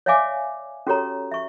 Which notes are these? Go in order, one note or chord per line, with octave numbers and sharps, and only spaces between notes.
C#5 D5 E5 F5 G#5 D6
C#4 F#4 G4 A4 C#5 A#5
E5 C#6